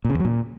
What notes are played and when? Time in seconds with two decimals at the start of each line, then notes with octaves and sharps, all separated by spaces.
0.05 A#2
0.10 C#3
0.15 E2
0.20 F#3
0.25 A#2